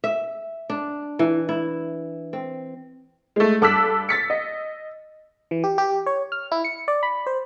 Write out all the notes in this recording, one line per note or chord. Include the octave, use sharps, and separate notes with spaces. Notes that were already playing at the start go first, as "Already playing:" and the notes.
E5
D4
E3
E4
C4
G#3 A3
G2 A4 D6 E6 F#6 B6
A6 B6 C#7
D#5
E3
G4
G4
C#5
F6
E4
C#7
D5
B5
C5